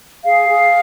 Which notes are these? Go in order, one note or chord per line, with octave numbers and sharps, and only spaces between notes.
G#4 F5
G#4